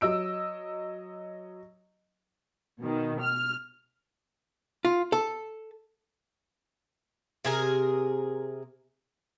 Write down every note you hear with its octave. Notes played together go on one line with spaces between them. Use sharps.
F#3 D#5 E6 D7
B2 D#3
F6
F4
A4
C3 G#4 A#4